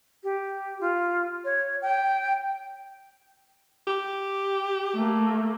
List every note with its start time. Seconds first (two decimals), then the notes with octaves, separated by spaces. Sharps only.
0.23 G4
0.81 F4
1.44 C#5
1.82 G5
3.87 G4
4.95 A3 A#3